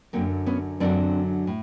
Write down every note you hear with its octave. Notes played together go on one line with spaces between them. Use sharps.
F#2 D3 F#3 A#3 C4
B3 C#4
F#2 D3 F#3 C4 D4
A2